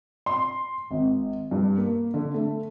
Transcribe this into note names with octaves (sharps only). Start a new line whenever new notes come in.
C6
G#1
G2
A#3
D3
A3